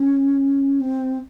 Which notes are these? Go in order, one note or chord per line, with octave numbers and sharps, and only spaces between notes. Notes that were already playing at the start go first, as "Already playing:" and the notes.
Already playing: C#4
C4